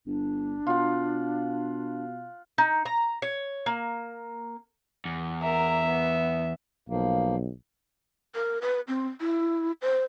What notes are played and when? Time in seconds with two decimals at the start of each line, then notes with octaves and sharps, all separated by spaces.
0.07 G1 D4
0.67 B2 F4 F#5
2.58 D#4
2.85 A#5
3.22 C#5
3.66 A#3
5.05 E2
5.43 A#4 E5 A#5
5.87 B3
6.89 B1 F3 A#3
8.35 A#4
8.62 B4
8.88 C4
9.21 E4
9.82 C5